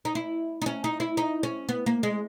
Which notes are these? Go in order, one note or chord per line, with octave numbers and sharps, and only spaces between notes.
D#4
E4
D#4
C#4
D#4
E4
D#4
C#4
B3
A#3
G#3